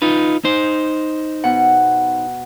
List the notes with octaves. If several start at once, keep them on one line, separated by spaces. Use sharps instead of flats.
D#4 F4 B4
D#4 C5
B2 F#5